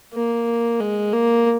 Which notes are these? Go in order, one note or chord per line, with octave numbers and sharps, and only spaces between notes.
A#3
G#3
A#3